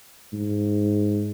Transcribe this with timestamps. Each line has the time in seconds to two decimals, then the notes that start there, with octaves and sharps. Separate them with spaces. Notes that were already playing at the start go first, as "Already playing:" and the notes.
0.33 G#2